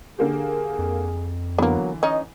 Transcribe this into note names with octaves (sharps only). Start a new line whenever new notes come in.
D3 A#3 G4 G#4
F2
D3 E3 F#3 A#3 B3
C#4 D#4 D#5